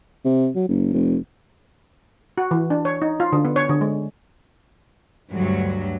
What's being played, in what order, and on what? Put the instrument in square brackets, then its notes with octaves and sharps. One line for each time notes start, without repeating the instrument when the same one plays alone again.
[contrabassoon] C3
F#3
F#1
F1
[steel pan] F#4
E3
D4
C#5
D#4
F4
D3
B3
C#5
D3
G#3
[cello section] D2 G2 F#3